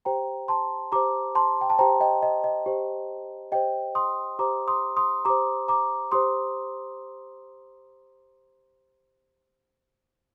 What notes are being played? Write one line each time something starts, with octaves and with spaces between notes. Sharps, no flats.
G4 C5 G5 A#5
A5 C6
G4 C5 A#5 D6
A5 C6
G5
A5
G4 C5 G5 A#5
D#5 G5
D#5
D#5
G4 C5
G4 C5 D#5 G5
C6 D#6
G4 C5 A#5 D6
C6 D#6
C6 D#6
G4 C5 A#5 D6
A#5 D6
G4 C5 C6 D#6